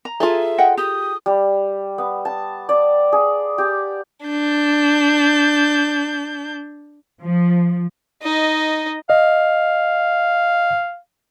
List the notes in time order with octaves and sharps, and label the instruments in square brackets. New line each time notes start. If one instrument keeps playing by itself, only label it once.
[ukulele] A#5
[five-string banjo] F4 G#4 A4 [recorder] E5
[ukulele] D#5 F#5 G5
[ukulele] G4 [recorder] D#6
[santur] G3
B3
A5
D5
G#4
G4
[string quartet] D4 G6
[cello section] F3
[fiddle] D#4 D#5
[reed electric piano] D#5 [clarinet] F5